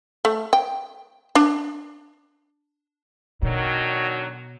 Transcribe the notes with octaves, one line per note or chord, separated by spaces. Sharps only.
A3
G5
D4
B2 D3 D#3 F#3